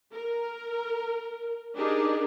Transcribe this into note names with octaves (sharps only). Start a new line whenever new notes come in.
A#4
D4 D#4 G4 G#4 A#4 D5